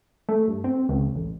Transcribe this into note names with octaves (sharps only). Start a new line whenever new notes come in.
A3
G2
C4
C#2
A1